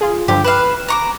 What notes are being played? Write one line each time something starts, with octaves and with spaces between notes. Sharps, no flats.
F4 G#4
G2 D3 F3 G4
B4 F5 F#6 E7
A#5 C#6 D6